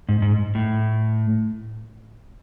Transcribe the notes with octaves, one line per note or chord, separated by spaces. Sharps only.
G#2
G#2
A2